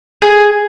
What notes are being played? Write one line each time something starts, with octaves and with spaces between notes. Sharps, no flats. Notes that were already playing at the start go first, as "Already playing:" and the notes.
G#4